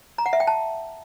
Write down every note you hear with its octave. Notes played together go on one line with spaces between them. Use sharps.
A#5
F#5
E5
G5
A5